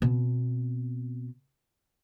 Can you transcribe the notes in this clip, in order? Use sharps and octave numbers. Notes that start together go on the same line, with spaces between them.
B2 C4